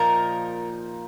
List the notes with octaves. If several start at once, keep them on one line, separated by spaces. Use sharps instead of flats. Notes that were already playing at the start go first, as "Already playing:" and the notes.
Already playing: A#2 F3 D#4 A#4